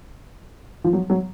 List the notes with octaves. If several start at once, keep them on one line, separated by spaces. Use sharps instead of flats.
F3
F#3
F#3